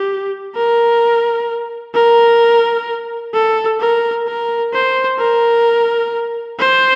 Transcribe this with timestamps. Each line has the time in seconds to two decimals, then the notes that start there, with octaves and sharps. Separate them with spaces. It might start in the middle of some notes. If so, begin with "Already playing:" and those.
Already playing: G4
0.55 A#4
1.94 A#4
3.34 A4
3.80 A#4
4.27 A#4
4.73 C5
5.19 A#4
6.59 C5